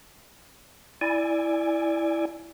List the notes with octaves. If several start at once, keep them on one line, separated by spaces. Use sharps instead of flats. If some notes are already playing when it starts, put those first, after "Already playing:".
E4 D5 G#5